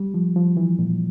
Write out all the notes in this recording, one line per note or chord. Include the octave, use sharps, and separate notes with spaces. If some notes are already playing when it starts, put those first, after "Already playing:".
Already playing: G3
F3
F3
E3
A#2